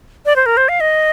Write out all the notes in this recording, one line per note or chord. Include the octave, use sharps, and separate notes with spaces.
D5
C5
A#4
C5
F5
D#5